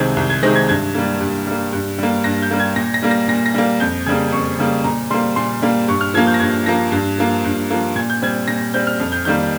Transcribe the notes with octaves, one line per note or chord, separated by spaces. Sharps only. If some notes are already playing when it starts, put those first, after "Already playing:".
Already playing: C2 C3 D#3 G#3 C4 G#6
C2
G#6
C3 D#3 G#3 C4 A#6
G#6
G2 G#6
G3 A#3
G2
G3 A#3
G2
G3 A#3
G2 A#6
G6
G3 A#3
G#6
A#2 A#6
A#6
G3 A#3
A#6
A#2 A#6
A#6
G3 A#3
F2 G6
C#3 G3 A#3 G#6
F2 C#6
C#3 G3 A#3
A#2 A#5
G3 A#3 C6
A#2 C6
G3 A#3
G2 C#6
F6
F3 A#3 G#6
G6
A#6
G2 G#6
F3 A#3 A#6
G2
F3 A#3
G2
F3 A#3
A#2 G#6
G6
G3 C4 G#6
A#2 A#6
G3 C4 G6
F6
F2
G6
D#3 G3 A#3 G6